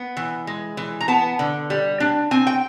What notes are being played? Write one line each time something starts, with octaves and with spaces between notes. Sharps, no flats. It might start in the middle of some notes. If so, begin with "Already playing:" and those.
Already playing: B3
E3
G#3
E3
A#5
B3 A5
D3
G3
D4
C4 G#5
G5